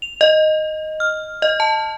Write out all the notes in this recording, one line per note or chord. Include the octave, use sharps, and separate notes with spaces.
F7
D#5
F6
D#5
A5